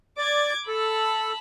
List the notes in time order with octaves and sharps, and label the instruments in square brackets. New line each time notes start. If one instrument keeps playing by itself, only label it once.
[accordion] D5 [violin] D6 G#6
[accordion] A4 [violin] A5 B5